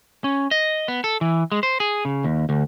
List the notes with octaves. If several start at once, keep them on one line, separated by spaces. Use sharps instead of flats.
C#4
D#5
B3
A4
E3
G#3
C5
G#4
C#3
D#2
D2